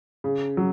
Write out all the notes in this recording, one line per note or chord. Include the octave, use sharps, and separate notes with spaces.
C#3
F#3